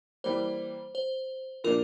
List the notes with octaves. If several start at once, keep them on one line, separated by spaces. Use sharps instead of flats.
E3 G3 A#3 C5
C5
A#2 F3 A#3 D4 A#4